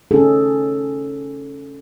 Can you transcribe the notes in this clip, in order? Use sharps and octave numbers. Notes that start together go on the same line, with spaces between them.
C#4 D#4 G#4 A4